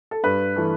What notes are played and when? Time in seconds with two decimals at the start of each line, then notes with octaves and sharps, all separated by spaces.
0.11 A4
0.23 G2 B4
0.56 E3 A3